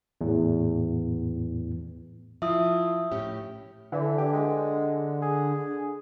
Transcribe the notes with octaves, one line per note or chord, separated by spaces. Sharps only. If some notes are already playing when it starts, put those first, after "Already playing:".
E2 A2
F3 E4 F4 E5 D#6
A2 C#4 G4
D3 E3
G4
G#3
G#4